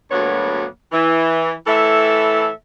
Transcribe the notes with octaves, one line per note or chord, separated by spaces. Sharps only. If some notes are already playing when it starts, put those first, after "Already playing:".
D2 G2 F#3 A#3 B3 C#5
E3
A2 E3 A4 E5